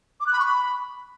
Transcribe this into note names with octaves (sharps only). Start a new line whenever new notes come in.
D6
F#6
B5
C#6
B5